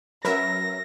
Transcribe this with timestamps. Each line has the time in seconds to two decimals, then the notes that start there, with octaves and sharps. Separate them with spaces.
0.25 F#3 C#4 A#4 B4 E5 A#6